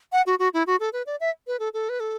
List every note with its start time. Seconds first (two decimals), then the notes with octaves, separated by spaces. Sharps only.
0.12 F#5
0.26 F#4
0.39 F#4
0.54 E4
0.67 F#4
0.80 A4
0.93 B4
1.07 D5
1.20 E5
1.47 B4
1.60 A4
1.74 A4
1.89 B4
2.00 A4